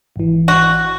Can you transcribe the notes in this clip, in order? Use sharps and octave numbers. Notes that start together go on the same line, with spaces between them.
G#1 E3
F#4